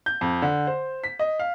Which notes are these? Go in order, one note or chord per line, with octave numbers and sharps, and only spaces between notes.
G6
F2
D3
C5
B6
D#5
F5